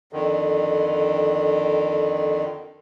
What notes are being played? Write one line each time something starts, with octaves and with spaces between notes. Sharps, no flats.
F2 D3 D#3